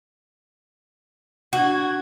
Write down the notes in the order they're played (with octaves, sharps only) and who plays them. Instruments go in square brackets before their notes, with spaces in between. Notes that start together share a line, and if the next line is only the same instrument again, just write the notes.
[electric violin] D4 G#6 [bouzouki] F#4